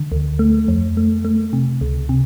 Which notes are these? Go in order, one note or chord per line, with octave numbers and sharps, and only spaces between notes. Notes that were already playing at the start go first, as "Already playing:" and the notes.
Already playing: D3
D2
A3
F2
A3
A3
C3
C#2
C3